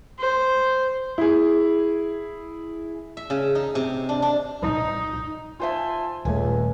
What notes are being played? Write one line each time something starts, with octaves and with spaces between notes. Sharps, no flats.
C5
E4 G#4
E5
C#3
D#4
C3
D4
D4
D#4
F4 C5 E5 G#5 A5 C6
D#1 C#2 A3 G#5